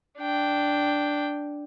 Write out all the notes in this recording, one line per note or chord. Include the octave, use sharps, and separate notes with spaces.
D4 G5